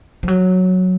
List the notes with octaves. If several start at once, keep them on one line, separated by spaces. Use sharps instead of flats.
F3
F#3